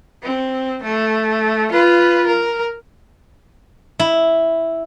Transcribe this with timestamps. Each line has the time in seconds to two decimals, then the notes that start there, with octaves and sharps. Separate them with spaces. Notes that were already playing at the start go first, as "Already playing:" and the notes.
0.23 C4
0.83 A3
1.72 F4 B4
2.27 A#4
3.99 E4